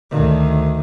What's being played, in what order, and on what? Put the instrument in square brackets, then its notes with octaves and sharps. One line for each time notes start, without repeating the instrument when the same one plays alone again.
[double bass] D2 D#3